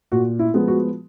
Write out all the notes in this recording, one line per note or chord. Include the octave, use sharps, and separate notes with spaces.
A#2 F#4
E4
F3 G#3 B3
F#4